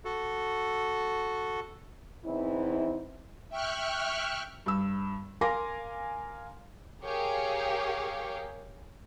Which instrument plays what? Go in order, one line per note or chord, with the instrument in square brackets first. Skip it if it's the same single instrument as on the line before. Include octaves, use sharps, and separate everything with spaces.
[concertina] F#4 A4
[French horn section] E2 E3 C4 D#4 E4
[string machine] E5 G5 C#6 F6 F#6
[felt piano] G2 E6
A#4 F5 G#5 C6 D6 A#6
[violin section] G4 G#4 A#4 C#5 F5